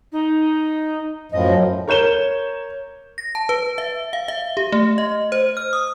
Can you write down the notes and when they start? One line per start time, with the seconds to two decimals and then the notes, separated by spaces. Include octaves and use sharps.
0.12 D#4
1.32 F#2 A2 F3 D#5
1.88 A#4 C#5 G6 E7 G7
3.18 A#6
3.35 A5
3.49 B4
3.78 E5
4.13 F5
4.28 E5
4.57 G4
4.72 A3
4.98 D#5
5.32 C5
5.57 F6
5.73 D#6